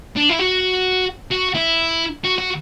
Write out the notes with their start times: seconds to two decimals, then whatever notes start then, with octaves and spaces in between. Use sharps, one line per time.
0.16 D4
0.29 E4
0.39 F#4
1.31 F#4
1.54 E4
2.24 F#4
2.38 F#4